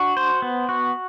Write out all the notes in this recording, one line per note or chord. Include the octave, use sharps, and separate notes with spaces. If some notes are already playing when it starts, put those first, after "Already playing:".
Already playing: D4 F#4
C5
B3
F#4